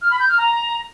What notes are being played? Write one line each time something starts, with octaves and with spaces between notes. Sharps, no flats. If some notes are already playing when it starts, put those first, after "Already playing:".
F6
B5
G6
F6
A#5